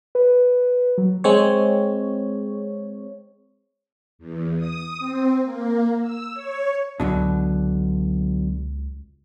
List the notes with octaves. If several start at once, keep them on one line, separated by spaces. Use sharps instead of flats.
B4
F#3
G#3 C4 C#5
E2
D#6
C4
A#3
E6
C#5
C#2 B2 D3 F#3